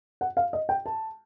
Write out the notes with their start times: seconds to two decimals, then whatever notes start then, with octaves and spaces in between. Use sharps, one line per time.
0.21 F#5
0.37 F5
0.53 D#5
0.69 G5
0.86 A5